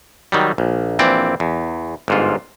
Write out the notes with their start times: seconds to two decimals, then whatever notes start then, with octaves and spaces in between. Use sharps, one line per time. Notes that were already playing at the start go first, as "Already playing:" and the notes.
0.32 D#3 F#3 G3
0.58 A#1
0.99 A#1 E3 C4 D5
1.40 E2
2.08 G1 G#2 F4